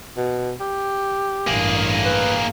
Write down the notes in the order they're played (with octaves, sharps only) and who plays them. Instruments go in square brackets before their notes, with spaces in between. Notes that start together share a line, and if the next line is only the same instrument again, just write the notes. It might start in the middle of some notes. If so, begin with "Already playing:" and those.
[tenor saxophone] B2
G4
[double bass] A1 G2 [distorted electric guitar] A#3 G#4
[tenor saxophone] B4